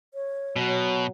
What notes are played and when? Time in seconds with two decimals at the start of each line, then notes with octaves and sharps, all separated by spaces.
0.14 C#5
0.56 B2 F#3